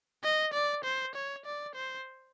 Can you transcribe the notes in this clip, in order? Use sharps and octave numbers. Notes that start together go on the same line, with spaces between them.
D#5
D5
C5
C#5
D5
C5